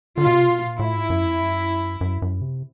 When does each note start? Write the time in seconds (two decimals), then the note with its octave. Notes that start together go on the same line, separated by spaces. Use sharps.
0.18 D3 F4
0.26 B2
0.33 C3
0.48 B2
0.65 A#2
0.79 A2 E4
0.94 G#2
1.10 F#2
1.25 F2
1.41 F#2
2.01 F#2
2.22 F#2
2.42 C3